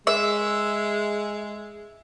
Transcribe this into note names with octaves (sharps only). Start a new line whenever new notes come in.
G#3 E5